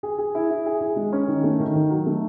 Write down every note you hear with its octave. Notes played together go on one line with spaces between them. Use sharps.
G#4
G#4
E4
E4
G#4
G#4
G#3
C#4
D#3
A3
D#3
D#3
F#3
A3